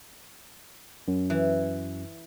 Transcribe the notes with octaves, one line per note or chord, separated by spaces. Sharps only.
F#2
E3